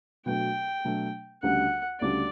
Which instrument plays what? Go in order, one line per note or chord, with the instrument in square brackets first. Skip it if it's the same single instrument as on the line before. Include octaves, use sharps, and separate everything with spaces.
[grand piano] B2 F#3 A3 D4 [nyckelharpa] G5
[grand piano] B2 F#3 A3 D4
[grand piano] D2 C#3 G3 D4 [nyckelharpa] F#5
[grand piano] D2 C#3 G3 D4 [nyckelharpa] D5